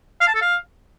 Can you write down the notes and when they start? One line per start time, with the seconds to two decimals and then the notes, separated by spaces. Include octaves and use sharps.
0.21 F5
0.28 A5
0.35 A4
0.42 F5